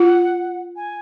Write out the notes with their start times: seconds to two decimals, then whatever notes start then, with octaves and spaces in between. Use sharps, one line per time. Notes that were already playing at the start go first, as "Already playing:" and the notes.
Already playing: F4 F#5
0.76 G#5